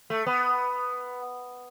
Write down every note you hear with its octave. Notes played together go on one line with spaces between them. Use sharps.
A3
B3